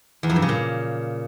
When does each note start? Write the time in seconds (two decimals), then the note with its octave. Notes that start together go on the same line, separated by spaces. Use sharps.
0.23 E2
0.30 F2
0.36 G2
0.42 C#3
0.49 A#2